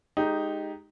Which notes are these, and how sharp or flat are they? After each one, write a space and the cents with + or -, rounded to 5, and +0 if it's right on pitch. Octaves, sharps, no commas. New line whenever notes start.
G#3 +25 D#4 +0 G4 +0